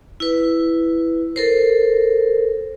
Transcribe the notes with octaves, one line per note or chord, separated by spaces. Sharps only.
E4 B4
A4 A#4 C5